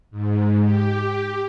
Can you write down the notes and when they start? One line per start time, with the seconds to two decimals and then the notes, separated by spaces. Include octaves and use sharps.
0.11 G#2
0.63 G4